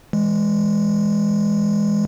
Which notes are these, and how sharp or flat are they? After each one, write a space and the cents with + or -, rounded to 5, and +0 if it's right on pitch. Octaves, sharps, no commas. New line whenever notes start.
E3 +0 G#3 +0